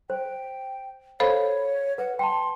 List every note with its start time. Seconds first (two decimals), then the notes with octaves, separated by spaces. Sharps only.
0.10 C5 G5
1.20 A4 C5 C#5 F5 B5
1.98 B4 F#5
2.19 G5 A5 C6